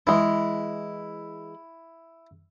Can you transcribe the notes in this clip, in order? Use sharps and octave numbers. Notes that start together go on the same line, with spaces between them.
E3 G#3 E4